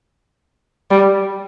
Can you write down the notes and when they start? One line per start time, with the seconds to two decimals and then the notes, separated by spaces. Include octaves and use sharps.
0.91 G3